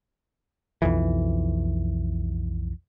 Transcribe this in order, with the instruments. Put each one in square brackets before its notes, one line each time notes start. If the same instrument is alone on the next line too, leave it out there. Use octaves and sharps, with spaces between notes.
[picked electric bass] B1 F2 E3